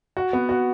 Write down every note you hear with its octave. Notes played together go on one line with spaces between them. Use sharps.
F#4
B3
F#4